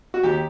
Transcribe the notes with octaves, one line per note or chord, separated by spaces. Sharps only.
F#4
D#2 G4